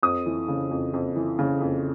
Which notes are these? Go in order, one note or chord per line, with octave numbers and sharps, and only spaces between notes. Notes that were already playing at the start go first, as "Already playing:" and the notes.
F2 D#6
E3
C#3
F2
F2
E3
C#3
F2